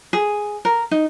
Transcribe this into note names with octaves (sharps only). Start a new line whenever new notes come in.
G#4
A#4
D#4